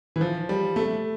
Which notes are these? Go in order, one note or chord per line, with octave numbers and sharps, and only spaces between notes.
E3
F3
G3
A3